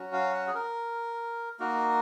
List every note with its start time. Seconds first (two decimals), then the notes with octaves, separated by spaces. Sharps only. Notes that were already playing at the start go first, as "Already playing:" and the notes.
Already playing: F#3 C#4 F#4
0.13 F5
0.34 F#5
0.47 G#4
0.55 A#4
1.60 A#3 D#4 F#4 A#4